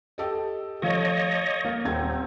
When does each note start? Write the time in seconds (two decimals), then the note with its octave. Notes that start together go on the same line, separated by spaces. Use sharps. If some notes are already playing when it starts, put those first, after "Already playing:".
0.18 G4 A4 D#5
0.82 F3 A3 C#5 D#5
1.64 A#3
1.85 D#1 C4 G#6